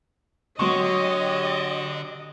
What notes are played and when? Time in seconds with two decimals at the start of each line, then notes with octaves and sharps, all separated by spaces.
0.59 D3 F#3 G4 C#5 D#5 C6 C#6